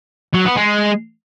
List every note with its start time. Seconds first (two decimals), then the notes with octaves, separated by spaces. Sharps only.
0.34 F#3
0.45 B3
0.57 G#3